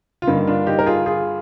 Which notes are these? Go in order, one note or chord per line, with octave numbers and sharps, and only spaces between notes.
F4
G2 D3 G3 A#3 D#4
D4 F4
D#4 G4
A#4
F4 G#4
F4 G#4